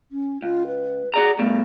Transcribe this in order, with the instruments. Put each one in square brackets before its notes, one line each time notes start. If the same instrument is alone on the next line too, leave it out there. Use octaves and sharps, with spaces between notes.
[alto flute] C#4
[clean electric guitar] C#2 [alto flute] F4
[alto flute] B4
[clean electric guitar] F#4 D5 A#5 [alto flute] G#4
[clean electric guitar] G2 B2 [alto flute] A3